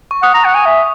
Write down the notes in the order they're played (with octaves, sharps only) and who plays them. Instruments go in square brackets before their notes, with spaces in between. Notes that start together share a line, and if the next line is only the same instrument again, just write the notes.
[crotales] C#6
[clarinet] F#5 [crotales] D#6
[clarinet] A#5
F#5
G#5
E5